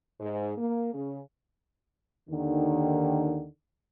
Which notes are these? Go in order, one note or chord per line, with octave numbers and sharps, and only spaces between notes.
G#2
A#3
C#3
D#2 D3 D#3